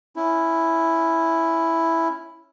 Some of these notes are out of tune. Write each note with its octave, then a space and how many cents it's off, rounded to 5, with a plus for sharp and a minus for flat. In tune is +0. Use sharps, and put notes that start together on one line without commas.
C#4 +0 E4 +0